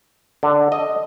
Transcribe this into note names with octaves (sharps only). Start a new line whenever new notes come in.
D3
D#5